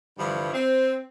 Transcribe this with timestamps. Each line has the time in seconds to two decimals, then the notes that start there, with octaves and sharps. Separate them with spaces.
0.18 G2 D3 E3 F3 G3
0.53 C4